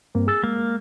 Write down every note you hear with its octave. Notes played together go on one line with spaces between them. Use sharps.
G2 A#3 C4
G#4 E6 A6
G#3 A#3